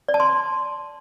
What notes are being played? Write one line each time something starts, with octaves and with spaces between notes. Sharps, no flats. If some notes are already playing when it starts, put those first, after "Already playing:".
D5
A5
C6